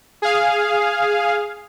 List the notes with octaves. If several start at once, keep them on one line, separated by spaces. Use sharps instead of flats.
G#4 F5